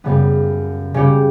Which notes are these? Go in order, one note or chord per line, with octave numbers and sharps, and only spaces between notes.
F#2 C#3 G3 B3
C#3 G3 C#4 G4